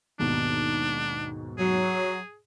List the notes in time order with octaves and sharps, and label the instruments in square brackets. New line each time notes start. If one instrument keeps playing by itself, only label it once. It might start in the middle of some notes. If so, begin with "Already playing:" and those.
[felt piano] D#2 G#2 B2 [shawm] D4
[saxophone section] F#3 [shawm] G#4